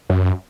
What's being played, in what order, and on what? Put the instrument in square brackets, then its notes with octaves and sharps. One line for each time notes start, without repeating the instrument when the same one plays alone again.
[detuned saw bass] F#2